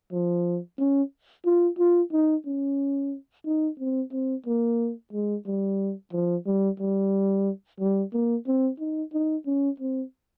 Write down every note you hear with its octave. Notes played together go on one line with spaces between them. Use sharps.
F3
C#4
F4
F4
D#4
C#4
D#4
C4
C4
A#3
G#3
G3
F3
G3
G3
G3
A#3
C4
D#4
D#4
C#4
C4